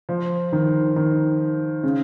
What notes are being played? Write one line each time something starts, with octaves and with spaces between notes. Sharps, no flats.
F3
D#3
D#3
C#3